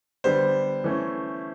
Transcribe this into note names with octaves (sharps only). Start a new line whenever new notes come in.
D3 G3 B3 C5
E3 A3 C#4